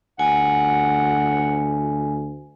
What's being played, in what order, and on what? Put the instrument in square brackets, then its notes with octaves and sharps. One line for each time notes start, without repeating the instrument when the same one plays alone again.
[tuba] D2 [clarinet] F#5 [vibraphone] G#5